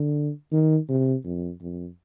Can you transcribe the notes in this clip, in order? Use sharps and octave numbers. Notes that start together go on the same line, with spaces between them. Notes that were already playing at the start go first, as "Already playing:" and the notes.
Already playing: D3
D#3
C3
F2
F2